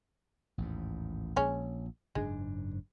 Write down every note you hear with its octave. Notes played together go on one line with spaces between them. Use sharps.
A1 D#2 G#2
A#1 G#3 C#4
F#1 G#2 G#3 D4